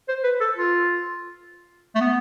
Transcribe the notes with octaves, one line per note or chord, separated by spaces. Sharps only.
C5
B4
A4
F4
A3
B3